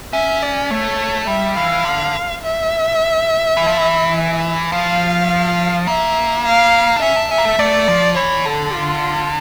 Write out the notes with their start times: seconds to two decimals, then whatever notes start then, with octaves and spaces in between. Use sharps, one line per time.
0.13 C#4 E5
0.42 D5
0.71 A3 C#5
1.27 G3 E5
1.57 E3 F5
1.85 D3
2.43 E5
3.57 E3
3.67 F3
3.77 E3
4.72 F3 F5
5.87 A#3 E5
6.45 F5
6.96 D4
7.02 C#4 E5
7.16 D4
7.31 C#4 E5
7.38 A#3
7.45 A3
7.59 A3 D5
7.88 F3
8.16 E3 C#5
8.45 D3 A4
8.74 F4